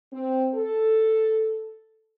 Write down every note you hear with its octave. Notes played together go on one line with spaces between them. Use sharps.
C4
A4